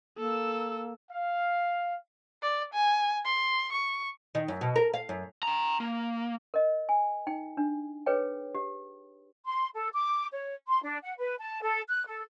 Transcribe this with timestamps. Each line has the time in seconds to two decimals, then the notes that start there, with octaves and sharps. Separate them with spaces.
0.18 A#3 A4 E6
1.10 F5
2.42 D5
2.73 G#5
3.25 C6
3.72 C#6
4.35 D#3
4.48 F#2
4.61 B2
4.76 A#4
4.94 F5
5.09 F#2
5.43 G5 A#5
5.80 A#3
6.54 A#4 D#5
6.89 G#5
7.27 D#4 G5
7.57 D4
8.06 G#4 B4 C#5 G5
8.55 G4
9.46 C6
9.75 A4
9.94 D6
10.32 C#5
10.67 C6
10.83 D4
11.03 F#5
11.18 B4
11.39 A5
11.62 A4
11.88 F#6
12.06 A4